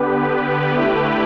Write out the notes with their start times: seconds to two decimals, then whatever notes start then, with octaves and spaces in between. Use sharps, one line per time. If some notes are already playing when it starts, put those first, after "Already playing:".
Already playing: D3 B3 G4 B4
0.74 D3 A3 E4 G4 B4